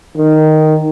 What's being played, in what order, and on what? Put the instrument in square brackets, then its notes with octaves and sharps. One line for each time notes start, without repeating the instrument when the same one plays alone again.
[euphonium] D#3